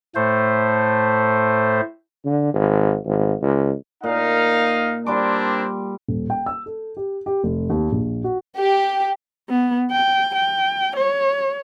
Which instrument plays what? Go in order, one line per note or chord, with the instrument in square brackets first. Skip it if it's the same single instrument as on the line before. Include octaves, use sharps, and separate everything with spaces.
[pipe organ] A2 A3 C5
[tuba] D3
G#1
G#1
C#2
[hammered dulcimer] A#2 [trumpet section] D#4 F5
[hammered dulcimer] G3 C6 D6 [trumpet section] A#3 C4 D4
[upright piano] D#1
G5
E6
A4
G4
G4
F1
D#2
A#1
F#4
[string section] G4
[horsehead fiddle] B3
G5
G5
C#5